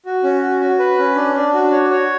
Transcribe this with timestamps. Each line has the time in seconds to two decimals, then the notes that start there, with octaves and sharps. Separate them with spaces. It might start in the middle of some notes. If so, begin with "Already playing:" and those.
0.06 F#4
0.24 C#4
0.42 F#4
0.61 F#4
0.79 B4
0.98 C#4
1.16 D4
1.35 D4
1.54 F#4
1.72 C#5
1.90 C#5